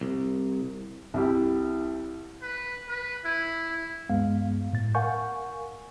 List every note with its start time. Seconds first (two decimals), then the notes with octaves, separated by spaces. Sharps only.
0.01 C2
1.14 C2 E4 G4
2.42 B4
2.89 B4
3.25 E4
4.10 D2 G2 G#3 B3 F5
4.73 A2 A6
4.95 A#4 F5 F#5 G#5 C#6 G6